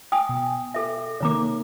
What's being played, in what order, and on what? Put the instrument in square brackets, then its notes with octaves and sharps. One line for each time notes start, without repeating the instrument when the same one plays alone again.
[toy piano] G5 G#5 D#6
[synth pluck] B2
[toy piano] G#4 A4 E5
[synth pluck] C3 D#3 A#3 [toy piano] C#5 A#5 D6